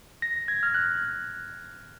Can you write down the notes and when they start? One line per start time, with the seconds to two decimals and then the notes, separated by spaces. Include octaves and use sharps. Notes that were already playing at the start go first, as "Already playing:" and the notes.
0.22 A#6
0.48 G#6
0.63 F6
0.74 F#6